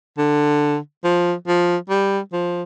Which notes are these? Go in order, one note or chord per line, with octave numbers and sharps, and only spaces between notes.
D3
F3
F3
G3
F3